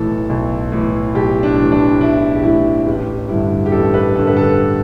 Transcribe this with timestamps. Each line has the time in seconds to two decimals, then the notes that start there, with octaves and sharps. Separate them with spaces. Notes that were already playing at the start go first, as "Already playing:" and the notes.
Already playing: B1 A2 E3 A4
0.29 B1
0.72 A2 E3
1.14 B1 G4
1.43 D4
1.58 A2 E3
1.72 D4
2.00 B1 E4
2.35 G4
2.43 A2 E3 E4
2.86 A1 G4
3.29 G2 D3 E4
3.66 G4
3.72 A1 A4
3.94 B4
4.15 G2 D3 A4
4.27 B4
4.37 A4